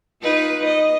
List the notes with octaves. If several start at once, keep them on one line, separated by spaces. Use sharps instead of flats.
D#4 F4 B4
D#5